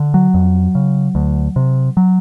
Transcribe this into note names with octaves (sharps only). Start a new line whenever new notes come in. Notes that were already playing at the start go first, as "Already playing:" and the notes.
Already playing: D3
F#3
F2
C#3
D2
C3
F#3